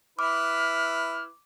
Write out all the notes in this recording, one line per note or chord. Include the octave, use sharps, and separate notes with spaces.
E4 B4 D6 F6